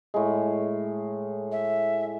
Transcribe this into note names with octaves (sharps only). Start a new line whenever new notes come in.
A2 G#3
E5